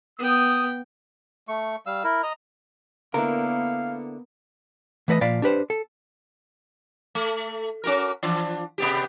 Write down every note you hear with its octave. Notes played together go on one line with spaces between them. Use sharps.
B3 G5 D#6
A3 C#6
G3 F5 E6
E4 A#4
D#5 A#5
D3 A#3 B3 E4 A#4 F5
E3 A3 B4 D5 D#5
A#2 F3 D5 F5 B5
D4 G4 B4 C5
A4
A3
C#4 F#4 A#4
E3 F3 D4
C3 B3 G4